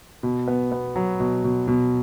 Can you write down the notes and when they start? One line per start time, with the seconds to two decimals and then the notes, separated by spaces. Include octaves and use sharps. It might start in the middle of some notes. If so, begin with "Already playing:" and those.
0.23 B2
0.48 B3
0.72 B3
0.96 F#3
1.20 B2
1.44 B2
1.68 B2